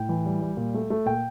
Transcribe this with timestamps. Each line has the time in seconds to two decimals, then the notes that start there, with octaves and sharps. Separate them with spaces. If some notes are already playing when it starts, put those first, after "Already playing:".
Already playing: A2 G5
0.09 E3
0.25 G3
0.41 G3
0.57 A#2
0.74 A3
0.90 A3
1.06 A#2 G5